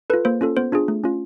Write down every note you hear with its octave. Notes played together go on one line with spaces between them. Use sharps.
F4 A4 B4
A#3 C5
C#4 F4 A4
B3 C5
D4 F4 G#4
A3
C#4 F4